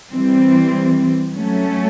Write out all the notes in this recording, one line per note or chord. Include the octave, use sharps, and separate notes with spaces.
E3 G3 C4
F#3 A3 C#4